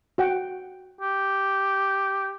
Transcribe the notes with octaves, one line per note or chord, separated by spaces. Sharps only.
F#4 F#5 G5
G4